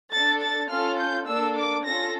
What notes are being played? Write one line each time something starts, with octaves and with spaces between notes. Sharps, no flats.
D4 A4 A6
A6
C#4 F4 A4 F6
G6
A#3 D4 A4 E6
D6
C#4 F4 A4 A#6